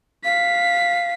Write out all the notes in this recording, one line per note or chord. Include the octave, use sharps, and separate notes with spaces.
F5 B6